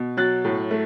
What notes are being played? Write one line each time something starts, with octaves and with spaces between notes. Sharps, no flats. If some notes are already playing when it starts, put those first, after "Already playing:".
Already playing: B2
F#3 F#6 A6
A2
A3